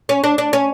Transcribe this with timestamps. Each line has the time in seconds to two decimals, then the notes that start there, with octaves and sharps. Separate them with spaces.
0.09 C#4
0.24 D4
0.38 D4
0.53 C#4